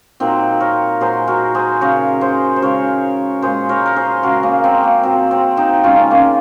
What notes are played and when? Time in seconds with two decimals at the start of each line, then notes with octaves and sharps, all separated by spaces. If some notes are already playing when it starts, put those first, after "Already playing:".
0.20 A#2 F#3 C4 D#4
0.60 A#4 C#5
1.00 A#2 F#3 G#4 C5
1.27 F#4 A#4
1.55 G#4 C5
1.81 C#3 F#3 A#4 C#5
2.21 G#4 C5
2.56 C5
2.62 C#3 G#3 A#4 C#5
3.42 A#2 G#3 G#4 C5
3.69 A#4 C#5
3.86 A#4
3.96 G#4 C5
4.23 C#3 G#3 F#4 A#4
4.43 A#3 C#4
4.64 C4
4.84 A#3
5.03 A#2 F#3 C4
5.31 C4
5.57 C4 D#4
5.84 C#3 G#3 C#4 F4
6.10 A#3 C#4